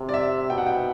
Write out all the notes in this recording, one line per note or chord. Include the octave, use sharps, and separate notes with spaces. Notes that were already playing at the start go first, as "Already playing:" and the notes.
Already playing: C3
D5
E5
B2 G5
F#5
G5